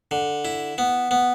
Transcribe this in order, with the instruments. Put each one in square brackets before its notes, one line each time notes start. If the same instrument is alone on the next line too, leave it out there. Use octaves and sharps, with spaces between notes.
[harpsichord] D3
E4
B3
B3